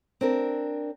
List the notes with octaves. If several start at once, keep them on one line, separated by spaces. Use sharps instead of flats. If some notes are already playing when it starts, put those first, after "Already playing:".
C4 D4 A#4